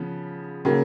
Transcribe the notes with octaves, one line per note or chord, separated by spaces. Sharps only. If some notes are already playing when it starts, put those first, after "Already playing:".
Already playing: C#3 F3 B3
C#3 F#3 A#3